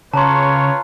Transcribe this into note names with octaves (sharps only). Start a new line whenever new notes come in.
C#3 F4 B4 C#5 A5 A#5 C6